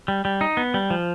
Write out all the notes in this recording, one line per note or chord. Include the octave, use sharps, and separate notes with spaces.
G3
G3
D#4
B3
G3
F3